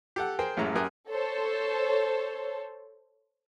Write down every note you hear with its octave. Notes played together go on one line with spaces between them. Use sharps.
G4 A4 F#5
G#4 A#4 C5 G5
A1 F#2 A2 G#3 A4 A#5
F#2 G4 A#4 G#5 D#6 F#6
A4 C5 C#5